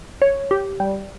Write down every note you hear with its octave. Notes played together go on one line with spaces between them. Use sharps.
C#5
G4
G3